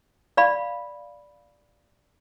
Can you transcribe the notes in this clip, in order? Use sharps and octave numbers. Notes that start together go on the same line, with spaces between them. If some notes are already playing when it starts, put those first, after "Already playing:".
D5 F5 B5